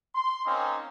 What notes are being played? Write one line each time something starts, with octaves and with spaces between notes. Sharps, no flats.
C6
A#3 C4 C#4 D#4